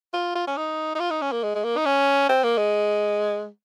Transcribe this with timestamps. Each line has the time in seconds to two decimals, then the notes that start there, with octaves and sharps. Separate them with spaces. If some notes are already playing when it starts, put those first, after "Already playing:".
0.13 F4
0.35 F4
0.47 C#4
0.57 D#4
0.95 D#4
1.00 F4
1.11 D#4
1.21 C#4
1.32 A#3
1.43 G#3
1.55 G#3
1.64 A#3
1.77 D#4
1.86 C#4
2.29 C4
2.43 A#3
2.58 G#3